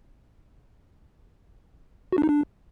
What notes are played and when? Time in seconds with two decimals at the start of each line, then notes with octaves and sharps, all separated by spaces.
2.12 F#4
2.18 D4
2.23 D#4
2.29 D4